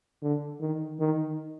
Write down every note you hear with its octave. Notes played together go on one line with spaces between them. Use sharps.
D3
D#3
D#3